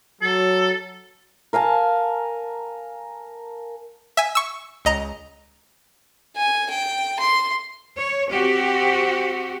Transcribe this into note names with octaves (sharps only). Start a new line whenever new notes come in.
F#3 A4
A#4 F5 G#5 A5
E5 G#5
C#6 E6
C#2 D#5 A#5
G#5
G5
C6
C#5
C4 F#4 G4